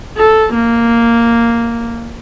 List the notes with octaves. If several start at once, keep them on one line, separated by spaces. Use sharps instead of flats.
A4
A#3